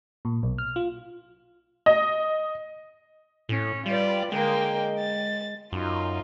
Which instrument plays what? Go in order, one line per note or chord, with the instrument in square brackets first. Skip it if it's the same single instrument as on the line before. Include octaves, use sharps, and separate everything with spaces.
[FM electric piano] A#2
B1
F6
F4
[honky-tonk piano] D#5
[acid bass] A2 [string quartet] C#4
[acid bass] G3 [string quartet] F4 B4 D5
[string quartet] D3 A#3 G5 [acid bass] G#3
[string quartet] A6
[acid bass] F#2 [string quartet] D#4 F4